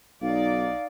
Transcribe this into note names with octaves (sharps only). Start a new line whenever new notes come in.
B1 D#4 D5 F5